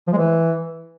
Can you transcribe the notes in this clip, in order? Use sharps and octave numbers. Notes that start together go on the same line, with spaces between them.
F3
G#3
E3